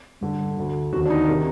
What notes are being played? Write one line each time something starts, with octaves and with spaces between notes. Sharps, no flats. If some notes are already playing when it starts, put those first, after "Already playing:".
G2 D3
D2 D3
D#2 D3 F#4
D4
D#4
C3 D#3